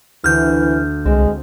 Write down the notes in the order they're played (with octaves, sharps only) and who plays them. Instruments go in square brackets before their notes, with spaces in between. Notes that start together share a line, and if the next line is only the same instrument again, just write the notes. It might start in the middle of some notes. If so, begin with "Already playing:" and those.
[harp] D2 [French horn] E3 [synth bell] F6 G6
[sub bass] C2 [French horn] G#3 [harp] C4